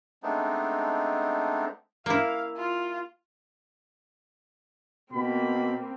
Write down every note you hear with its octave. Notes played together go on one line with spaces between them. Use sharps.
G#3 A3 B3 C4 D4 D#4
A#3 E4 F5
F4
B2 A#3 C4 B5